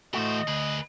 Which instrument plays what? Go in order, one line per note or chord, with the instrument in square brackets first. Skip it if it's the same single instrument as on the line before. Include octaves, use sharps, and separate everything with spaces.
[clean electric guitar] A2 A3 F#4 [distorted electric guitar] E3 C5 [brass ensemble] D#5
[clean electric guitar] D2 [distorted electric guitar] G#4 B4